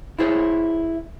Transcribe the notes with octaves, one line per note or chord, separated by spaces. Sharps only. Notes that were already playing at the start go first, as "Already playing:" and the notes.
E4 F4 G#4 C5 C#5